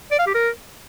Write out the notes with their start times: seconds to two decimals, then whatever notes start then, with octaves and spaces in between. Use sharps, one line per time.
0.12 D5
0.19 F5
0.27 G4
0.35 A#4